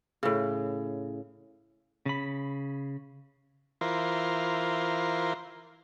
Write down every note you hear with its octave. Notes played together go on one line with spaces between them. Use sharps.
A2 C#3
C#3 B5
E3 F4 A#4 C5